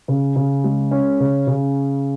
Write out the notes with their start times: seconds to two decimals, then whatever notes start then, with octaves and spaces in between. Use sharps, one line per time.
0.08 C#3
0.36 C#3
0.64 G#3
0.91 C#4
1.20 C#3
1.47 C#3